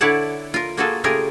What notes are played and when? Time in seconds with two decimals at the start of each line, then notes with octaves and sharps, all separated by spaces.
0.01 D3 E4 C#5 D5 F#5 A5
0.54 F4 A#4
0.77 A#3 F4 F#4 G#4 A4
1.04 C#3 A3 F4 G4 G#4 A#4